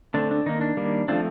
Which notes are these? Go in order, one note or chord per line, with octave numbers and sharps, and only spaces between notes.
D3 A3 C4 D4
D4
D#3 A#3 D#4
D4
D#3 G3 A#3
F3 A3 C4 D4 F4